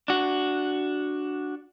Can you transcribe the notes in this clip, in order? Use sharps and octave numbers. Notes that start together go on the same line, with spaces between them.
D4 F#4